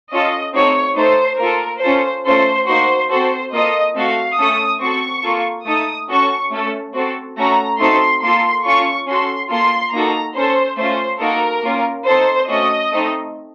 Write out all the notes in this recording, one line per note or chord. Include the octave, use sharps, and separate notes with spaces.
C#4 F4 A4 D#5
A3 C4 D#4 F#4 A4 C#5
A3 D#4 A4 C5
A#3 F4 A4 A#4
C#4 F4 A4 C5
A3 C#4 F4 A4 C5
A#3 D#4 F#4 C5
C4 F#4 A4 C5
A#3 F4 A4 D#5
A3 C4 F#4 A4 F5
A3 C#4 A4 D#6
C4 F#4 A4 C#6
A#3 F4 A4
A3 D#4 A4 D#6
C#4 F#4 A4 C#6
A3 C#4 A4
C4 F#4 A4
A3 C#4 F#4 A4 A#5
A3 C4 D#4 F#4 A4 C6
A#3 F4 A4 C6
C#4 F4 A4 C#6
C#4 F#4 A4 C6
A#3 F4 A4 C6
A#3 D#4 F#4 A4 A#5
C#4 A4 C5
A3 C#4 F4 C5
A#3 D#4 F#4 A4 A#4
A#3 C#4 F4
C4 D#4 A4 C5
A3 C#4 F#4 D#5
A3 C4 D#4 A4